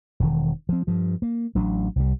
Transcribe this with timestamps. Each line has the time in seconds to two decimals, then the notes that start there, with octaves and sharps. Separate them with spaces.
0.20 E1 D#3
0.69 F3 C4
0.87 G2 F3
1.22 A#3
1.55 A1 F#3 D4
1.96 C2 G3